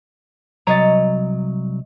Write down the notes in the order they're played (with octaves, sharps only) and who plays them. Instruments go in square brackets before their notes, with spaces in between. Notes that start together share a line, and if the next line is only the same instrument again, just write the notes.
[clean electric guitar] C2 F#3 A#5 [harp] C#5 D#5 A6